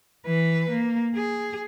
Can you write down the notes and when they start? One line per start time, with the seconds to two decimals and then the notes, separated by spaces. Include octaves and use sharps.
0.26 E3 B4
0.70 A#3
1.15 G#4